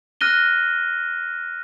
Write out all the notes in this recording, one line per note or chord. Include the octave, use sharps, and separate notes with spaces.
F6 F#6 A#6 D#7 G7